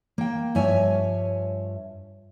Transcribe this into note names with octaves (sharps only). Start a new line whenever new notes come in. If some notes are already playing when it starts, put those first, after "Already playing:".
A#3 G5
G2 F3 C#5 E5 G#5